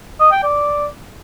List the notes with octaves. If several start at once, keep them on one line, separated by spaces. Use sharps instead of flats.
D#5
G5
D5